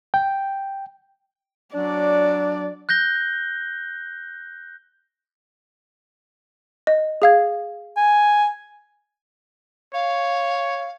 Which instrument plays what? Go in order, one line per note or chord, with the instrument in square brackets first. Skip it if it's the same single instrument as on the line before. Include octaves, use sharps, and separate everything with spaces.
[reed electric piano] G5
[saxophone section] F#3 D4 [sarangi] D5
[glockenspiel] F#6 G6 A#6 G7
[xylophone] D#5
G#4 F5 G#6
[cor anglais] G#5
[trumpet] C#5 [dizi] F5